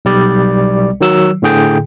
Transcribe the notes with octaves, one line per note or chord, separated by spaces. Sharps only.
B1 G3 D5
D#3 F#3 E6
A2 D3 G#4 G5